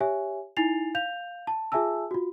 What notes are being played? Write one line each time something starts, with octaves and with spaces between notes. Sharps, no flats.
G4 C#5 E5 G#5
D#4 E4 G#5 A6 C7 F7
F5 G6 F7
A5
F4 G#4 E5 G#5 A5 E6
F4 F#4